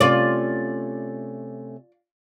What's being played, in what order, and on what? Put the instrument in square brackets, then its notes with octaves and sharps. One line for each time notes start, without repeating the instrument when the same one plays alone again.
[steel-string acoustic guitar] C3 A3 C#4 [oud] F4 D5